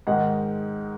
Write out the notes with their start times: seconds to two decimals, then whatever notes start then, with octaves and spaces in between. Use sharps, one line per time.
0.07 G#2 D#3 G#3 F#5